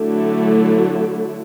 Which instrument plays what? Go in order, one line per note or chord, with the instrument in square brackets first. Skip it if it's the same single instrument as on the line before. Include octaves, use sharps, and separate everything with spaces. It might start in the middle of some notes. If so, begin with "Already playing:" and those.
Already playing: [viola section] D3 F#3 A3 E4